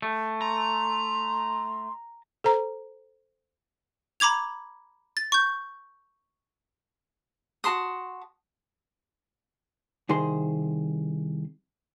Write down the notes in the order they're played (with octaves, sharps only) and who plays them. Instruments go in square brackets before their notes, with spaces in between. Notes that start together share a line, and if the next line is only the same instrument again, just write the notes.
[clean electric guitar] A3
[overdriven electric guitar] A#5 [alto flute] C6
[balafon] A4 C5 A#5
[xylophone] A#5 B5 D6 G#6 F7
A6
C#6 G6
[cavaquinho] F#4 A5 C6 D#6
[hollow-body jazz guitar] C2 D#3 G#4 C5 C6